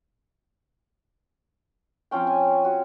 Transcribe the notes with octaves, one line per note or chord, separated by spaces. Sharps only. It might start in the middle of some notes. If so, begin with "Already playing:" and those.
F3 C4 C#4 G5
G#5
F#4